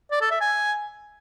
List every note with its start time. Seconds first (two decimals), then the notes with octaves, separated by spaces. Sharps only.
0.12 D5
0.21 A4
0.31 E5
0.41 G#5